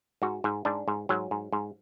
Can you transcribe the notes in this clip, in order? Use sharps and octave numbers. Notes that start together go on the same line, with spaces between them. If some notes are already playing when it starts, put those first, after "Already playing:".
G#2 F#4
G#2
G#2 D4
G#2
G#2 F#3
G#2
G#2